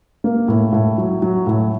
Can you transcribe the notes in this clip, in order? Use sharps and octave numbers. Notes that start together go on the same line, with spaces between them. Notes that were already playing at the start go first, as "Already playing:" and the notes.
A#3
A2
A2
F#3
F#3
A2